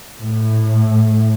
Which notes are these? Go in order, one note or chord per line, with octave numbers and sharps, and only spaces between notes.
A2